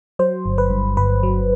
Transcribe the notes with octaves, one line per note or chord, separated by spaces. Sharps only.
F#3 C5
G1
B4
G2
G1 B4
F#3